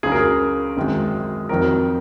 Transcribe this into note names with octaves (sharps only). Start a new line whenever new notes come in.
C#2 C#3 F#3 G#4
A#4
G#4
G#1 F#2 D#3 G#3
F2 D#3 F#3 A#4